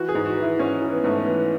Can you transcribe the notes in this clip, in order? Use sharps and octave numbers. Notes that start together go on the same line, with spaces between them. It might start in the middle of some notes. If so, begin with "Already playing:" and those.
Already playing: E3 F#4
G#4
G#2
F#4
E3
E4
G#2 C#4
E3
B3
G#2 A3
B3
E3